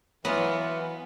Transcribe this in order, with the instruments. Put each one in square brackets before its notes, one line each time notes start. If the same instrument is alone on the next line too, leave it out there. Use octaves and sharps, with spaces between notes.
[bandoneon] E3 [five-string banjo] F#3 F4 [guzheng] B3